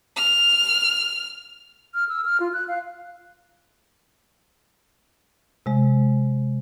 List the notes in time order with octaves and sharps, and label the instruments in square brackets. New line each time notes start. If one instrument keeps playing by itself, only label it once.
[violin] F6
[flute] F6
E6
F6
F4
F#6
F5
[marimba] C3 G#3